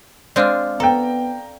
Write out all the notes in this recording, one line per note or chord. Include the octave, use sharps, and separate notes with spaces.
G#3 C4 D4 D5 F5 F6
B3 A4 G5 A#5